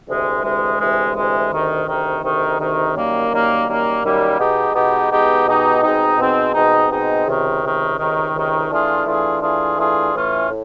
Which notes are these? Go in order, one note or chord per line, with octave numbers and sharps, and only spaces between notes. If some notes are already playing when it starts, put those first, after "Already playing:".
D2 C3 E3 G#3
D2 C3 E3 G#3
D2 C3 E3 G#3
D2 C3 E3 G#3
D2 C3 D#3
D2 C3 D#3
D2 C3 D#3
D2 C3 D#3
F#2 D#3 G3 A#3
F#2 D#3 G3 A#3
F#2 D#3 G3 A#3
F#2 D#3 G3 A#3
B2 G#3 B3 D#4 G4
B2 G#3 B3 D#4 G4
B2 G#3 B3 D#4 G4
B2 G#3 B3 D#4 G4
B2 G#3 C4 D#4
B2 G#3 C4 D#4
B2 G#3 C4 D#4
B2 G#3 C4 D#4
C#2 C3 D#3
C#2 C3 D#3
C#2 C3 D#3
C#2 C3 D#3
E3 A3 D4 F4 G#4
E3 A3 D4 F4 G#4
E3 A3 D4 F4 G#4
E3 A3 D4 F4 G#4
A2 E3 A3 C#4 F4
A2